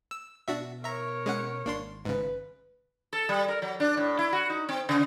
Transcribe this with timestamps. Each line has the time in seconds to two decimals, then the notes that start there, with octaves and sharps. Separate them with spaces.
0.11 E6
0.48 B2 D4 F#4 E5
0.83 A#4 C#5 E5 A#5
1.26 G#3 C#4 F#5
1.66 G#1 A#3 D4 C6
2.05 G#2 C#3 B4
3.13 A4
3.29 G3
3.48 A#4
3.62 F#3
3.80 D4
3.97 A2
4.19 E4
4.33 F#4
4.50 D#4
4.69 C4
4.89 C#3